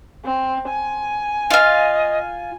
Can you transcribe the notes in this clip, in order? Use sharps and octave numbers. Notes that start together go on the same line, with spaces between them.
C4
G#5
F4 D#5 F5